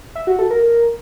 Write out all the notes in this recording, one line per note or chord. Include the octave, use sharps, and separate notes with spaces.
E5
F#4
A4
A#4